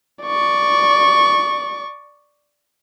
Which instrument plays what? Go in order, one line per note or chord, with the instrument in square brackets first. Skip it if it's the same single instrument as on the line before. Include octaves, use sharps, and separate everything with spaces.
[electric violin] D5 C#6